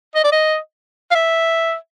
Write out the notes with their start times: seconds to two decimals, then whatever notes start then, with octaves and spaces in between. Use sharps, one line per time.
0.15 D#5
0.24 D5
0.33 D#5
1.11 F5
1.15 E5